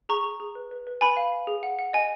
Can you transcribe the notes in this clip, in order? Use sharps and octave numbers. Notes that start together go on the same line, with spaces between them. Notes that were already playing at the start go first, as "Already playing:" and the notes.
G#4 A#5 C#6
G#4
G#4
B4
B4
B4
B4 G#5 B5
F5
F5
G#4
F#5
F#5
D#5 G#5